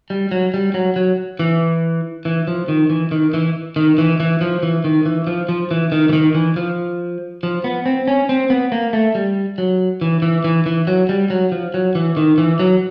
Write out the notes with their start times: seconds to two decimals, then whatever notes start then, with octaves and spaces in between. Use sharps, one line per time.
0.10 G3
0.31 F#3
0.54 G3
0.74 F#3
0.96 F#3
1.39 E3
2.25 E3
2.48 F3
2.68 D#3
2.90 E3
3.11 D#3
3.34 E3
3.76 D#3
3.98 E3
4.20 E3
4.41 F3
4.63 E3
4.84 D#3
5.06 E3
5.27 F3
5.49 F3
5.71 E3
5.92 D#3
6.09 E3
6.13 D#3
6.35 E3
6.56 F3
7.43 F3
7.64 B3
7.86 C4
8.08 C#4
8.29 C4
8.50 B3
8.72 A#3
8.93 A3
9.15 G3
9.58 F#3
10.01 E3
10.22 E3
10.44 E3
10.66 E3
10.87 F#3
11.09 G3
11.30 F#3
11.52 F3
11.74 F#3
11.95 E3
12.17 D#3
12.38 E3
12.60 F#3